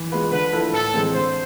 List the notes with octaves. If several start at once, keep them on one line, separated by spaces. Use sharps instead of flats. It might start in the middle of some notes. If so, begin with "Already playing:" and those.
Already playing: E3
G#3 B3 F4 B4
D3 B4
F3 A3 E4 A4
A2 A4
E3 G#3 C4
D3 C5